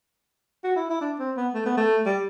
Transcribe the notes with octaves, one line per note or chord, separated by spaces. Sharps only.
F#4
E4
E4
D4
C4
B3
A3
B3
A3
G3